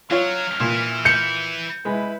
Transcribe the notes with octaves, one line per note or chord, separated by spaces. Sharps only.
F#3 F4 C#5 F6
A#2 E3 E4
G6 C#7
G#3 E4 B4